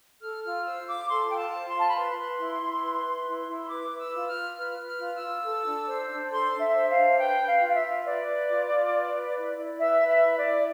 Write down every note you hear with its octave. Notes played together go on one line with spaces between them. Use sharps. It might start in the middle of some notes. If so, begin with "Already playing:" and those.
A4 F6
F4 F6
C5 E6
F4 D6
A4 C6
F4 G5
A5
C5
C6
F4 A5
B5
B4 C6
B4
E4
E4
B4
B4
E4
E4
C6
B4 D6
B4
E6
F4
F6
F4
B4 F6
B4
F6
F4
E6
F4
A4
D4
C5
D4
A4 C6
D4
E5
C5
F5
D4
B4 G5
B4
F5
F4
F5
E5
F4
B4 D5
B4
F4
F4
B4
B4
E4
E4
B4 E5
B4
E5
E4
D5
E4